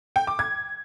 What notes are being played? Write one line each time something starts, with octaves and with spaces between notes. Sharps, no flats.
G5
D6
G#6